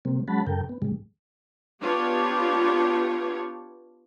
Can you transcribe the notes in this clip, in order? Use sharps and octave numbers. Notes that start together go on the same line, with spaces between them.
C3 G3 A#3 C4
F#3 G#3 C#4 F#5 A5 B5
F#2 C#3 A4 A#4 G5
B3
A2 C#3 G3 G#3
B3 D4 F4 G4 C#5